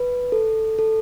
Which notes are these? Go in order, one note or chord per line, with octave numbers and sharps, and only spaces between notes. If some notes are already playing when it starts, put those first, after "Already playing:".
Already playing: B4
A4
A4